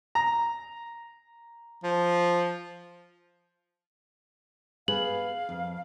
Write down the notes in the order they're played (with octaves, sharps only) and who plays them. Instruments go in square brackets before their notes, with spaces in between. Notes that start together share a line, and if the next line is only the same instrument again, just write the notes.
[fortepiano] A#5
[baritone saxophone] F3
[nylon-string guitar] B3 G#4 B4 [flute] F5 [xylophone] F#7
[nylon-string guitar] F2